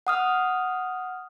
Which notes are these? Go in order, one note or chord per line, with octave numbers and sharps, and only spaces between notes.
F#5 D#6 F6